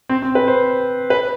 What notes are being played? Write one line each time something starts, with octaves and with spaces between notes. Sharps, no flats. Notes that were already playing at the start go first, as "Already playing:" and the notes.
C4
C4
B4
C5
B4